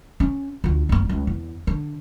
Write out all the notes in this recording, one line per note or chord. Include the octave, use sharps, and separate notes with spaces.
C#4
D2 F4
F#1 A#3
C#2 G3
E2
D3